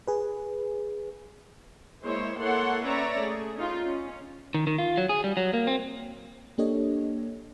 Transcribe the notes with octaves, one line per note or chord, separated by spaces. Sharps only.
G#4 B4
G#3 A#3 E4 C5 C#5
A#3 E4 A4 C#5 F#5 C6
C#4 B4 C#5 D5 E5 A#5
A3 G#4
C#4 D#4 F4
C#4
D#3
D#3
F4
F#3
G#4
G3
F#3
A#3
C4
A#3 D4 G4 A4 C#5 D#5